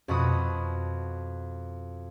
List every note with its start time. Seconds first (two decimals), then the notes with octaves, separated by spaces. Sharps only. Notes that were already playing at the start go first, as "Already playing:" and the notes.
0.08 F2 B2 F#4 B5 D#6